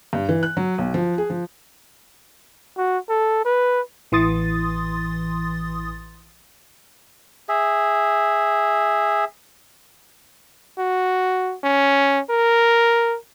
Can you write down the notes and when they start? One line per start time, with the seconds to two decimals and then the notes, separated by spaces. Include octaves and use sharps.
0.13 G2
0.29 E3
0.43 F#6
0.57 F#3
0.78 B1
0.94 F3
1.18 G#4
1.30 F3
2.77 F#4
3.09 A4
3.45 B4
4.12 A1 E3 C6 D#6 A6
7.49 G#4 E5
10.78 F#4
11.63 C#4
12.30 A#4